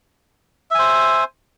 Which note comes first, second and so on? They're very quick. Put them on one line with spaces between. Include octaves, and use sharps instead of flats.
E5 G#5 C5